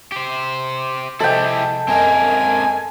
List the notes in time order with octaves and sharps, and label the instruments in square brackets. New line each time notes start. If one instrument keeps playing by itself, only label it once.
[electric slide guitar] G4 C5
[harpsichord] C3 F3 G#3 [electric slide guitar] E4 G4 [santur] A4 G5
[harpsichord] F#2 G#3 [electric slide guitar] C4 A#4 F5 [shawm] G#5